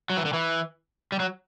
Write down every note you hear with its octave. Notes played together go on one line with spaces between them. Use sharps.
F#3
E3
D3
E3
G3
F#3